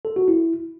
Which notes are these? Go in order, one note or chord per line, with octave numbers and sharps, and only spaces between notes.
A4
F#4
E4